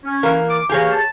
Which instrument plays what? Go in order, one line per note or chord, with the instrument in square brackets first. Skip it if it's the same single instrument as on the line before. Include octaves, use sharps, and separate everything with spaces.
[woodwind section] C#4
[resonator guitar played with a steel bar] E3 A#3 A#4
[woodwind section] D6
[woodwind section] E3 A#3 [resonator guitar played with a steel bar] G4 G#4 C#5
[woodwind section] A5